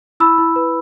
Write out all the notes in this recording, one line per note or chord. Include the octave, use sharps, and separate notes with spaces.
E4 B5 E6
E4
B4